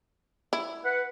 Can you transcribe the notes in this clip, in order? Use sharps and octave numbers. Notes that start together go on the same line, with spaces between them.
E4
B4 F#5